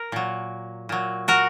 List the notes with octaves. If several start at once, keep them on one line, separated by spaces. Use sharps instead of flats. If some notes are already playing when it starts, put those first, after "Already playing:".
Already playing: A#4
A#2 F#3
A#2 F#3
F#4 A#4